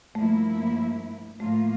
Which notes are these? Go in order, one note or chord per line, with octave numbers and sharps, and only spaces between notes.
G2 F3 A3 A#3 E4
A2 F3 A3 A#3 F4